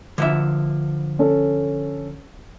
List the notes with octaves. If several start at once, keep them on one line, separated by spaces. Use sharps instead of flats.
D3 F3 E5
C#4 A4